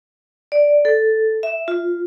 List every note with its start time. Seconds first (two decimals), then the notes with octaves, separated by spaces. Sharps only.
0.52 D5
0.85 A4
1.43 E5
1.68 F4